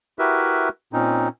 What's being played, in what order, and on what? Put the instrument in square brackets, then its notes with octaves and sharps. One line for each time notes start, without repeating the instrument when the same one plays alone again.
[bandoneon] E4 F#4 G4 A#4 B4 E5
A#2 C4 C#4 D#4